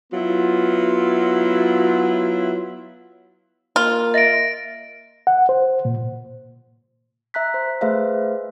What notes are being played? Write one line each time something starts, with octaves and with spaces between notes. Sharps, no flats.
F#3 B3 E4 F4
A#3 F4
D#5 E5 A6 A#6 D7
F#5
C5
A#2
E5 A#5 F#6 B6
C5
A3 G#4 B4 C5 E5 F5